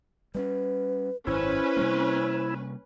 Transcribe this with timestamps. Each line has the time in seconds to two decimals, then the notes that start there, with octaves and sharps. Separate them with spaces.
0.35 G3 B3 C#4 B4
1.27 G#1 F#2 C#4 E4 B4 C5
1.77 C3 G3 A#3